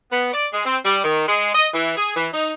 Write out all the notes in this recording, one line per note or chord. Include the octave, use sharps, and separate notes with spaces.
B3
D5
G#3
C4
G3
D#3
G#3
D#5
E3
G#4
E3
D#4